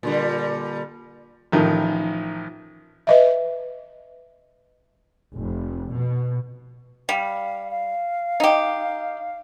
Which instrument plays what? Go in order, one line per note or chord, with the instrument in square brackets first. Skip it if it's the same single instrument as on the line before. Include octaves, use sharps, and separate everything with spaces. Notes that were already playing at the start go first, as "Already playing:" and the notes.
[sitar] A#2 D3 G3
[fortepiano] A1 D#3 F3
[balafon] B4 D#5 E5
[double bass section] F1
B2
[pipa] G3 [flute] F5
[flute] F5
[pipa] D#4 G4